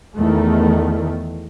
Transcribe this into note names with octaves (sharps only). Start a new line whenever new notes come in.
E2 D#3 A3